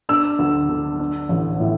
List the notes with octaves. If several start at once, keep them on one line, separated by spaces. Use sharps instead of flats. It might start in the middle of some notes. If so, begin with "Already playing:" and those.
D4 E6
D2
D3
D4
A1
A2